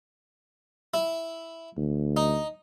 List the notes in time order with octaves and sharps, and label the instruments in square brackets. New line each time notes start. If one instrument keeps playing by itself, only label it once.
[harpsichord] E4
[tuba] D2
[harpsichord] D#4